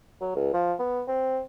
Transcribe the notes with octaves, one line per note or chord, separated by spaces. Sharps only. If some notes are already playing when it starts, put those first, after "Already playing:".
F#3
C#2
F3
B3
C4